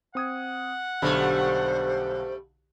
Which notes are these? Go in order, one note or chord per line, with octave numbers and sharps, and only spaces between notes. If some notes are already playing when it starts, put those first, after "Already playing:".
C4 F#5 D#6 G#6
B1 G2 D3 G3 A3 C5 B5